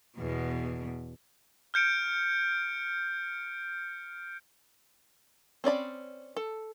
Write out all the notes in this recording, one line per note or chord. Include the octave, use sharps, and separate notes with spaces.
E2 B2
F6 G6 C#7 D7
C4 C#4 D5 B5
A4